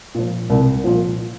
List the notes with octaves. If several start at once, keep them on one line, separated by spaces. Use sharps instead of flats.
A#2 F3
C2
A#2 F3